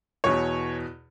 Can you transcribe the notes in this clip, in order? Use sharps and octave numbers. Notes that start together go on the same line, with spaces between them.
E2 B2 C#5